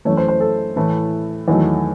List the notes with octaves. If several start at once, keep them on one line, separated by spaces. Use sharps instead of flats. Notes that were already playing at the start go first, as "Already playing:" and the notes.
F#2 E3 A3 C#5
C5
C5
A4
A2 E3 A3
E2 D#3 F#3 A3